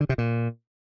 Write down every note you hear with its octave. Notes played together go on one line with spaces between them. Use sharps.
D3
C3
A#2